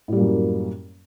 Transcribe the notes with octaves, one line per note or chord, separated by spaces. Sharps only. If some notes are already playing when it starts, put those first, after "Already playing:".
F#2 A2 G3 A#3